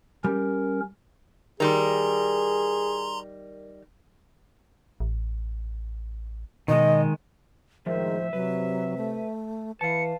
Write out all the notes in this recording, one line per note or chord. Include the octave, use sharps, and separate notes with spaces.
G3 C#4 A#4
D#3 G3 G#4 A#4 A#5 C6
A1
B2 D#3 G#3 D#5
A2 D#3 F3 G#3 C5 E5
C3 F#3 B4
A3
E3 B4 F5 A5 C#7